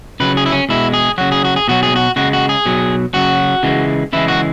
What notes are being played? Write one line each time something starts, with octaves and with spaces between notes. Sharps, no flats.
C#3 F#3 B4
G#4
E4
C#4
B2 G#3 E4
G#4
C#3 F#3 F#4
G#4
F#4
G#4
B2 F#3 F#4
G#4
F#4
C#3 G#3 F#4
F#4
G#4
B2 F#3
C#3 F#3 F#4
C#3 E3 G#3
C#3 E3 G#3 E4
F#4